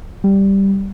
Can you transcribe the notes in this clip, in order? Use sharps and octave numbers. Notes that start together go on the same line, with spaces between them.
G3